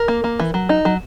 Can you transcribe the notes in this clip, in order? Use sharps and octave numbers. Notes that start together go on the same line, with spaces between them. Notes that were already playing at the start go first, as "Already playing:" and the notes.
Already playing: A#4
A#3
A#3
E3
F#3
D#4
F#3